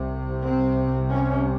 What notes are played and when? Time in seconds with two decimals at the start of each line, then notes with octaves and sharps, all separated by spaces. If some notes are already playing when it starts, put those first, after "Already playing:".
Already playing: C2 C3
0.44 C4
1.11 C#4